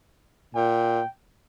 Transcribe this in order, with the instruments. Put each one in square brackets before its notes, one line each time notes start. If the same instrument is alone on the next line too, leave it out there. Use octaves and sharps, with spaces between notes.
[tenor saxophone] A#2 [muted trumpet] G5